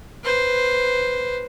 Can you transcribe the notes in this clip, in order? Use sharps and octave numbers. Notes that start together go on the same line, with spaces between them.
B4 C5